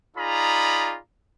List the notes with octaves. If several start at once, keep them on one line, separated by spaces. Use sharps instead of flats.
D#4 F4 G#4 D5 A#5 B5